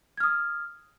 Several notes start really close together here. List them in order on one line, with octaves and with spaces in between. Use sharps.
G#6 F6 D#6